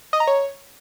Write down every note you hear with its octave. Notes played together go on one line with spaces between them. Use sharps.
D#5
A#5
C#5